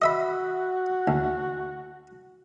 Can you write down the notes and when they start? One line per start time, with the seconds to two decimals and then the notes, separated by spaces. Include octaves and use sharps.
0.02 F#4 D#5 E5 B5
1.08 D2